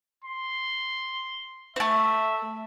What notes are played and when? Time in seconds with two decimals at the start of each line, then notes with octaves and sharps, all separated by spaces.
0.24 C6
1.76 A3 C4 E5